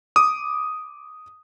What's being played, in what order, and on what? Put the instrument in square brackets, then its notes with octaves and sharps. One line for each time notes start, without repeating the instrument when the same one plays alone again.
[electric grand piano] D6 D#6